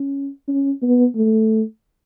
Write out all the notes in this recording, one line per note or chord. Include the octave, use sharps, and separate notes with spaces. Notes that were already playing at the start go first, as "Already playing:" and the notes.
Already playing: C#4
C#4
B3
A3